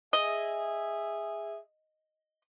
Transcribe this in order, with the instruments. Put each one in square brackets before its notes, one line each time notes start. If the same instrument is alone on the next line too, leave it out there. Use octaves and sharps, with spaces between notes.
[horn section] G#4 E5 [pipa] D#5